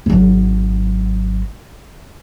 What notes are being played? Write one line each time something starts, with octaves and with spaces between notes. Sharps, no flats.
G#1 F#3